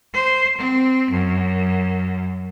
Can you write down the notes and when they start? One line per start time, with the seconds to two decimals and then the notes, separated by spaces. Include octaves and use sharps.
0.13 C5
0.57 C4
1.12 F#2